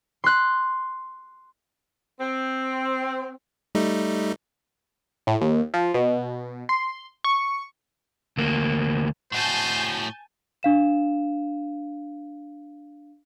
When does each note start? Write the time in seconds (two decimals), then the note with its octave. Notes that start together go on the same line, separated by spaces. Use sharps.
0.24 C6 F#6
2.20 C4
3.75 G3 A3 D#4
5.27 A2
5.41 D#2
5.74 F3
5.94 B2
6.69 C6
7.24 C#6
8.37 D2 A#3
9.32 A2 F#4 C5 G#5 A5 G6
10.63 D4 F5 E7